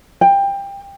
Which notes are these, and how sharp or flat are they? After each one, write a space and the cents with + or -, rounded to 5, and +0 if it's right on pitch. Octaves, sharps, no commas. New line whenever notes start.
G5 +20